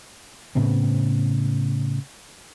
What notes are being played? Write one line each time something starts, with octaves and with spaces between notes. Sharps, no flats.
A2 C#3 B3 C4